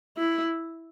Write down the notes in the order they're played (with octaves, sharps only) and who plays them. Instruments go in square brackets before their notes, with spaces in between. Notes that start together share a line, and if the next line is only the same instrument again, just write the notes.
[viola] E4